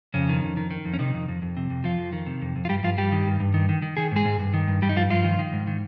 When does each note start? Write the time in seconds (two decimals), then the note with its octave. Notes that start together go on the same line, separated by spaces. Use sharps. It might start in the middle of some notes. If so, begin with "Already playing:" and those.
0.14 F2 C#3 C#4
0.29 D#3
0.43 F2
0.57 D#3
0.71 D#3
0.85 F2
0.94 C#4
0.99 C3 D#3 D#4
1.14 F2
1.28 F2
1.42 F2
1.57 C3
1.70 F2
1.84 F2 F3 F4
1.99 F2
2.13 D#3
2.26 C3
2.42 F2
2.56 F2
2.65 F4
2.69 G2 G3 G4
2.83 G2 F3 F4
2.98 G2 G3 G4
3.12 D#3
3.27 G2
3.40 G2
3.54 D#3
3.69 D#3
3.82 D#3
3.97 D#3 G#4
4.12 G#2 G#3 G#4
4.25 G#2
4.39 G2
4.54 D#3
4.68 G2
4.82 G2 G3 G4
4.89 D#4
4.96 G2 F3 F4
5.10 G2 F3 F4
5.24 D#3
5.39 D#3
5.53 G#2
5.67 D#3